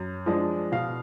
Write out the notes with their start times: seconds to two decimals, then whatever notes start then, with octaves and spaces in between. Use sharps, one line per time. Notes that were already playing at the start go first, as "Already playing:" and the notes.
Already playing: F#2
0.26 F3 G#3 D4
0.72 B2 F5